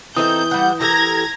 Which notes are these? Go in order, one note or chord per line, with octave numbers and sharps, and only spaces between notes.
E3 C4 D#4 A4 D#6 G6
G3 F#5
G4 A4 A#4 A#5 G#6 A#6